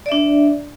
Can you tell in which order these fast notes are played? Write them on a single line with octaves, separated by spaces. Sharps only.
D5 E5 D4